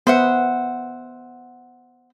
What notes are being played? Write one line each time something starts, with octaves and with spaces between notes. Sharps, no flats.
B3 C5 E5 F#5